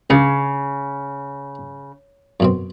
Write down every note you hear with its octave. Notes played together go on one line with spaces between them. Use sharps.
C#2 C#3 G#4
F#2 B2 C4